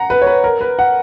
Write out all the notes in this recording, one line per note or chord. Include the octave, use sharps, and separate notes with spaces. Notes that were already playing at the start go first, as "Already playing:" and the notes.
Already playing: F#5 A#5
B4
C#5
B4
A#4
B4
F#5